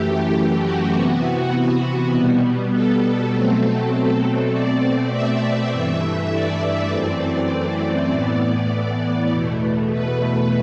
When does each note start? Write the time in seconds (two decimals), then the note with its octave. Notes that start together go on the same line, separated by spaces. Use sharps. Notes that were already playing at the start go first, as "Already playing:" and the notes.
Already playing: F#2 E3 A3 G4
0.33 G4
0.63 F#4
0.93 C3 E3 B3
2.13 B2 G3 B3
2.73 A4
3.32 B2 F#3 A3 C4
4.52 B2 A3 C4 D5
5.12 E5
5.72 G2 E3 A3
6.32 D5
6.91 F#2 E3 A3 C4 D5
8.11 A2 E3 B3
9.31 E2 B2 A3
9.91 B4